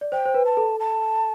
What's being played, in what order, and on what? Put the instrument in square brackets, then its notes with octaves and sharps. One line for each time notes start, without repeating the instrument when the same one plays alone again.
[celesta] D5
[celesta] C5 [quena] G5
[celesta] C5
B4
[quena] A5
[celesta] A4
[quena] A5